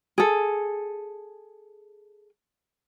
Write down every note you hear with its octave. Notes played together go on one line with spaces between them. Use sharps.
G#4 A4